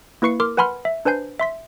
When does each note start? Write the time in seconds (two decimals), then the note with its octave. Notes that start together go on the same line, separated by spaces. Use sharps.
0.22 A#3 E4 B4 C#6 C7 C#7
0.40 A#4 C6 D6 F6
0.57 B4 F#5 G#5 B5 C6 F6
0.85 E5
1.05 D4 B4 C5 G#5 G6 C7
1.39 E5 C6 B6